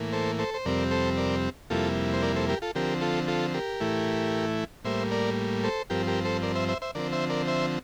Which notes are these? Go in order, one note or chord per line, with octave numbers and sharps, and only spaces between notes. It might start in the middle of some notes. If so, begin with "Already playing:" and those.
Already playing: A2 E3 A#3
A4 C5
A4 C5
C5
F2 C3 G3 C4 A#4 D5
A4 C5
A#4 D5
F2 C3 G3 A#3 E4 F4 A4
C5
A#4 D5
A4 C5
G4 A#4
F4 A4
D3 F3 C4 G4 A#4
F4 A4
F4 A4
G4 A#4
A2 E3 A3 E4
A2 G3 A#3 C5 E5
A#4 D5
A4 C5
G2 F3 C4 G4 A#4
G4 A#4
A4 C5
A#4 D5
C5 E5
C5 E5
C5 E5
D3 F3 C4 A#4 D5
C5 E5
A#4 D5
C5 E5